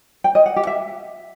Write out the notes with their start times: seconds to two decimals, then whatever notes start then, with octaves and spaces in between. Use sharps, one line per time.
0.24 G5
0.35 D#5
0.46 F#5
0.56 G4
0.67 E5